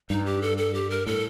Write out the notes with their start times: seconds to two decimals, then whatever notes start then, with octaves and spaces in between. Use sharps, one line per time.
0.10 G2 D#4
0.25 G4
0.42 A4
0.58 A4
0.74 G4
0.90 A#4
1.06 A2 A4